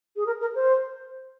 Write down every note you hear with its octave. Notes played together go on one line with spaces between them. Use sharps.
G#4
A#4
A#4
C5